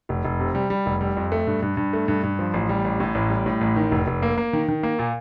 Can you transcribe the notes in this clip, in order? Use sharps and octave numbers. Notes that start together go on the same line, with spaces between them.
F1
F1
C3
G3
G3
F1
G3
F2
A3
G2
G2
G2
A3
G2
G2
F3
A1
G3
A1
A2
A1
G3
A2
A1
D#3
F1
F1
A#3
A#3
D#3
D#3
A#3
A#2